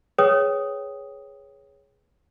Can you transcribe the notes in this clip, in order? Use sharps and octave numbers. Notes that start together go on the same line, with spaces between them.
G#4 B4 C#5 G5 D#6